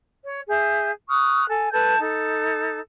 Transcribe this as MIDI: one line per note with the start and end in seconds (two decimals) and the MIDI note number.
0.24 0.40 73
0.48 0.91 68
0.48 0.91 76
0.48 0.91 91
1.09 1.45 85
1.09 1.45 87
1.09 1.45 89
1.09 1.45 90
1.49 1.69 69
1.49 1.69 80
1.72 1.98 69
1.72 1.98 71
1.72 1.98 81
1.72 1.98 91
2.00 2.80 63
2.00 2.80 69